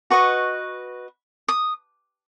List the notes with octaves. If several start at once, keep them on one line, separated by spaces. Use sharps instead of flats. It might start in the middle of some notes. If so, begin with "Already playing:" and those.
F#4 B4 D#5 C#6
D#6